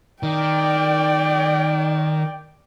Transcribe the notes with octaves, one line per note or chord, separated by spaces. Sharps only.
D#3 D5 G5